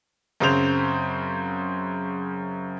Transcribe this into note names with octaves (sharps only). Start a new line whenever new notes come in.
F#2 C#3 C4 C5 F7